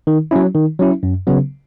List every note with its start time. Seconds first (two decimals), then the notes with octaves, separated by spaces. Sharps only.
0.07 D#3
0.31 F#3 C#4 E4
0.55 D#3
0.79 F#3 C#4 E4
1.03 F#2
1.27 C#3 F#3 B3